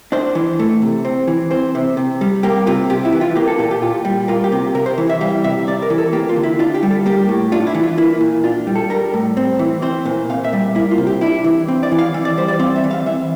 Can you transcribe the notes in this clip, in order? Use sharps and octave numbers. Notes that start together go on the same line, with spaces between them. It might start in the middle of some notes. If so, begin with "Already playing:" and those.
D4 C5
E3
A3
C3
C4
E3
C4 C5
C3
C3
G3
A#3 G4
C3 F4
C3 G4
E4
E3
F4
A#3 G4
A4
A#2 A4
G4
A#2 F4
G3
A#3 F4
G4
C3
C3 A#4
C5
E3
E5
G3 F5
C3 E5
C3 D5
A#4
E3
A4
A#3 G4
F4
D3
E4
D4 F4
G4
G3
A4
A#3 G4
A2
D4 F4
E4
E3
F4
A#3 E4
A#2
D4 F4
G3
A4
G3 A#4
A2
C4
E3
C4 C5
A#2
A#2 F5
E5
G3
A#3 E4
F4
C3
G4
D4 E4
E3
C4
D5
E3
F5
E3
D5
G3 C5
D5
C4 F5
E5
E3
F5
E3 E5